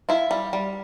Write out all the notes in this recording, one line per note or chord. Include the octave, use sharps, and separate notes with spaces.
E4 F4
G3
G3